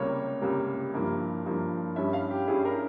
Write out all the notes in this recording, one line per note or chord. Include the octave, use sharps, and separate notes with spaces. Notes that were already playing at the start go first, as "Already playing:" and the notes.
Already playing: C#2 C3 G3 A#3 C#5
C#2 C3 G3 A#3
G2 F3 A#3 E4
G2 F3 A#3 E4
G2 G3 C#4 E4 E5
F5
G4
G2 G3 C#4 E4 G#4
A#4